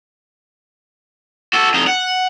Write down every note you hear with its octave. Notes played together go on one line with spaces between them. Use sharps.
F#4 A4
F2 D#4
F#5